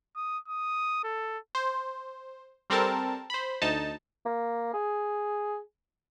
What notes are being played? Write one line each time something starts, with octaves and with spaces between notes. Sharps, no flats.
D#6
D#6
A4
C5
G3 C4 A4 A#4 A5
C5 B5
D2 D#4 A5
A#3
G#4